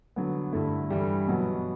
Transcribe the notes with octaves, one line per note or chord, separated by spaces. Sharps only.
D3 F#3 B3
G2 D3 A3 E4
G2 E3 G3
B2 F#3 B3